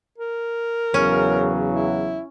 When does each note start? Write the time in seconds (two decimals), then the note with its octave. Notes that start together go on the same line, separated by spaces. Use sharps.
0.18 A#4
0.94 E2 C#3 F#3 C#4
1.73 E4